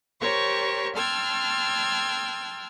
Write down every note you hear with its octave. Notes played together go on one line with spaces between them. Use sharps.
G4 A#4 C5 C#5 C#6
G5 A5 C6 E6 F6 G#6